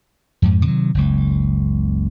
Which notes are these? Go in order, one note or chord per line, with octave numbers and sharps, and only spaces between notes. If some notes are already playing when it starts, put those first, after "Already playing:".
F2 G#2
C3 D#3 F#3
F#1 C#2